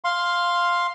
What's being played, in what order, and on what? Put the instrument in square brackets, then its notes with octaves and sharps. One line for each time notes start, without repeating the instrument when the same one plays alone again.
[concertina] F5 C6